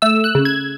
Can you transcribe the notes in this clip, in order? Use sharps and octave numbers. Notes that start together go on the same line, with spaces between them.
A3 E6
F#6
C#3
G#6